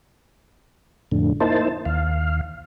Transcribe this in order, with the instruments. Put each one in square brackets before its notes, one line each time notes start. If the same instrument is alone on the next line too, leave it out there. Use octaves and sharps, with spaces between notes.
[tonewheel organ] F2 A2 D3
A#3 D#4 E4 C5 A5
D#2 F5